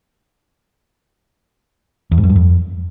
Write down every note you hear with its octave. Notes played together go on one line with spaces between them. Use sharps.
E2
G#2
F#2
G2
F2